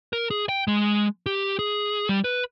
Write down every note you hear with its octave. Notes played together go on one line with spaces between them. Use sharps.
A#4
G#4
G5
G#3
G4
G#4
G3
B4